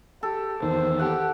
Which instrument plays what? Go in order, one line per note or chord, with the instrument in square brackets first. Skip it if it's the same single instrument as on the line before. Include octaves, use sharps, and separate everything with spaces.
[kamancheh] G4 [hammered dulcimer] A4
[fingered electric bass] E2 D#3 [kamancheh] C5
[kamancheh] G4 A4 [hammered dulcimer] F#5